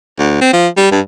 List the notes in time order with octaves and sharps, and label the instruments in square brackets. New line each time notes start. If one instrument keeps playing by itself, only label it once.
[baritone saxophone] D2
C4
F3
G3
G2